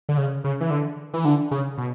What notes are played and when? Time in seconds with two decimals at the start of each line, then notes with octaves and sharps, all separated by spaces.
0.09 D3
0.17 C#3
0.44 C#3
0.61 E3
0.70 D3
1.14 E3
1.25 D3
1.51 C#3
1.78 B2